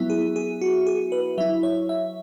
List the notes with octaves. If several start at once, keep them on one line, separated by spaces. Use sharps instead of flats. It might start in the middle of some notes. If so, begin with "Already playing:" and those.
Already playing: F#3 B3 E4 E5
G#4
G#4
F#4
G#4
B4
F#3 E4 E5
C#5
E5